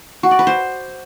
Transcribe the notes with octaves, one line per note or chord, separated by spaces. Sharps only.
F#4
D5
B4
C5